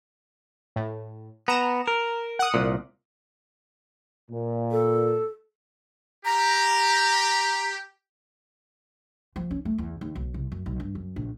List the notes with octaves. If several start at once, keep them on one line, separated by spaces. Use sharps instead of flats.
A2
B3 A#5 E7
A#4
F#5 D#6
C2 A#2
A#2
A4
G4 A#5
F3
C#4
A3
E2
D#2
B1
C2
F#2
B1
G2
F#2
A#1